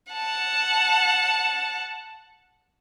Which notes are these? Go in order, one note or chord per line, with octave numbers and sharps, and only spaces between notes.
F#5 A5